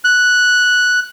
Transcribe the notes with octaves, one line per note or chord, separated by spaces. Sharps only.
F#6